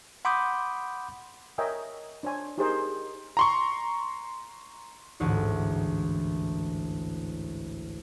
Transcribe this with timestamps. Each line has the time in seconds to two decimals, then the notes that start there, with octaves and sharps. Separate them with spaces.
0.25 F#5 B5 C6 D6 D#6 G6
1.58 A#4 C#5 D#5 E5 G5 G#5
2.23 D4 C5 C#5 G#5 C6
2.58 D#4 G4 G#4 A#4 C5 D#5
3.37 A#5 C6 C#6
5.20 A1 D2 G#2 E3